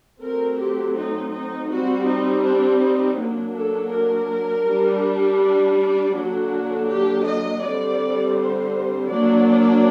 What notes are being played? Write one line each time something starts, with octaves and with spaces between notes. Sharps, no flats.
F#3 A3 C4 A#4
G4
D#4
D#4
G3 C4 F#4
D#4
D4
D#4
F#3 A#3 D4
A4
A#4
G3 D4
D5
D5
D3 F#3 A#3 D4 F#4
G4
D#5
D3 G3 C4 D5
C5
F#3 A#3 D4 D5